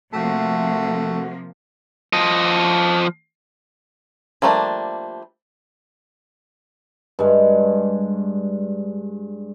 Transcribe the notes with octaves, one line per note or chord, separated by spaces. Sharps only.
C3 F3 A3 A#3 F#4
F3 D#5
F3 G3 A3 A#3 D4
G2 G#3